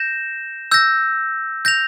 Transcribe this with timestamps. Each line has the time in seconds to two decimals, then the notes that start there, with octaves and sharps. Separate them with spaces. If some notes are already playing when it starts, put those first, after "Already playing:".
Already playing: G6 A#6 E7
0.71 E6 G6 A#6
1.65 G6 A#6 F7